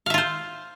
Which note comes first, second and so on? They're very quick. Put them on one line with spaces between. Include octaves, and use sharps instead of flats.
F5 E5 F4 C5